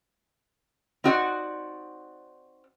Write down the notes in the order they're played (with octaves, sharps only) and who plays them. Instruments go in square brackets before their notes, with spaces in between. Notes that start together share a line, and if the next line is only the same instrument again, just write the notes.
[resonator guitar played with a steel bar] C4 D#4 F#4 D5 F#5